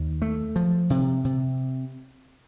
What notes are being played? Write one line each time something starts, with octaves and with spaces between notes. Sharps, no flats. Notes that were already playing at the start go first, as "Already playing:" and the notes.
Already playing: D#2
A3
F3
C3
C3